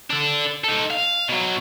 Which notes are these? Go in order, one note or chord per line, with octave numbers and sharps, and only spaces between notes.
D4 A4
D#4 A4
F5
B2 F#3